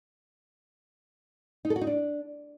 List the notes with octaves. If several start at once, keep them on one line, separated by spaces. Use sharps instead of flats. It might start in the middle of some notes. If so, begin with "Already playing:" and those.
D#4
A4
F#4
D#4
D4